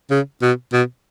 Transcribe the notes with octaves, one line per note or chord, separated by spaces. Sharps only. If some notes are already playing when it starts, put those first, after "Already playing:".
C#3
B2
B2